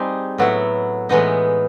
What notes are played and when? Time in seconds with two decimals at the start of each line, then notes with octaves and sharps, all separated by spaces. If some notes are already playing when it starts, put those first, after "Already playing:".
Already playing: G3 C4 D#4 G#4
0.38 A2 F#3 B3 E4
1.09 A2 E3 G#3 B3 D#4